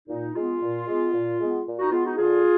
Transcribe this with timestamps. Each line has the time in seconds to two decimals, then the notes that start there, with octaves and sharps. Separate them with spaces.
0.09 A#2 D#4
0.35 G#3 B3 F4
0.61 A#2
0.87 G#3 B3
1.13 A#2
1.39 G#3 B3
1.66 A#2
1.79 D#4 F#4
1.92 G#3 B3 F4
2.06 D#4 F#4
2.18 D3 F4 G#4